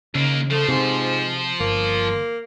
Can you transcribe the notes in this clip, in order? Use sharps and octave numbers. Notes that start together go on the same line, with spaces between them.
D#2 C#3 A#3
F3 A3 C5
G#2 C3
G1 A#3